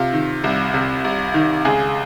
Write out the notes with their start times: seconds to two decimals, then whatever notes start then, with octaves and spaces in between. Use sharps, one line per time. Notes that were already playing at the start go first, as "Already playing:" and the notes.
Already playing: C3 F4
0.13 D#3
0.44 C2
0.74 C3
1.04 C2
1.34 D#3
1.65 C#2 G#4